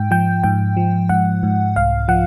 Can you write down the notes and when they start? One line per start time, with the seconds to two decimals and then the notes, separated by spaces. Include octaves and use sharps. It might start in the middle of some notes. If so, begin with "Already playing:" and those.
Already playing: G#2 G5
0.11 F3 G5
0.44 G#2 G5
0.77 F3
1.09 G#2 F#5
1.43 G#2
1.76 C2 F5
2.08 F3 F#5